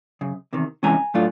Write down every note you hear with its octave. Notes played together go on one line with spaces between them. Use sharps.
F#2 C#3
E2 C3 D#3
C3 E3 G#3 C#4 G#5 A#5
A2 F#3 A3 D4 F4